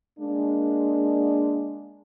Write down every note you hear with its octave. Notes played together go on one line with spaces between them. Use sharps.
G#3 A#3 D4